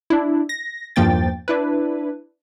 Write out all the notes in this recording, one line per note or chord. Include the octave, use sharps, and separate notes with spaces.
D4 E4
A#6
E2 G2 F3 A#3 G5 A6
D4 E4 B4